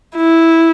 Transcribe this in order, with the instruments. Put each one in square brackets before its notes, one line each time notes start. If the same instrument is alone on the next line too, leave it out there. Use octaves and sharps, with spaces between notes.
[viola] E4